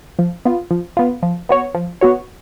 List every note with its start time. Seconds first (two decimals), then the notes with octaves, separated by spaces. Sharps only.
0.19 F3
0.45 B3 F4
0.71 F3
0.97 B3 F4
1.23 F3
1.49 B3 F#4 C#5
1.74 F3
2.01 B3 F#4 C#5